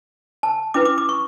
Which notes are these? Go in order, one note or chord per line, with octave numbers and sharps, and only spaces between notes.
A5
C#4 E4 B4 D6
D6
D6
C#6